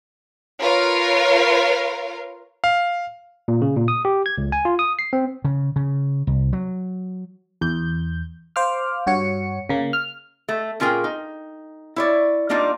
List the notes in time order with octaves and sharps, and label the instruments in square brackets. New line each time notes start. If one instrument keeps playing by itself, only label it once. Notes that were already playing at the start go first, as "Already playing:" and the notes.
[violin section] F4 A#4 B4 C#5 F5
[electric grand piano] F5
[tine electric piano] A#2
C#3
A#2
D#6
G4
G#6
C#2
G#5
F4
D#6
C7
C4
[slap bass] C#3
C#3
C2
F#3
[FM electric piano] E2 G6
C5 F5 D6 F6
G2 F#4 C#5 C#7
C#3 A#3
F6
[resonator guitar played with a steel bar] A3
A#2 C#4 F4 G#4 A#4 G5
D#4
E4 C#5 D5
G3 A#3 D4 D#4 F4